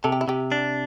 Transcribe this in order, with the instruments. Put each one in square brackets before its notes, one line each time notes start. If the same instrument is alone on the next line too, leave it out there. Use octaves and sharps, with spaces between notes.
[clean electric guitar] C3 [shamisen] A4
[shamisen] G4
E4
[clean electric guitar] C3 [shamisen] G4
[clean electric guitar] D4